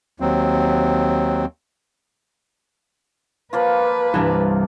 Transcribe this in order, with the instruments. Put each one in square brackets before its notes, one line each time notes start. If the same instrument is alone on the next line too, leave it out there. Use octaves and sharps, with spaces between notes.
[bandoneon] D#2 F#3 C4
[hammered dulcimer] F3 A#3 F4 [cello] B4
[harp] C2 G2 [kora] E3 D4 A#4